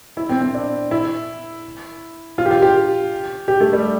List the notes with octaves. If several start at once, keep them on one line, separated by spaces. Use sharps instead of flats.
E4
C4
C4
D4
E4
F4
G4
F4
G4
G4
A3
G3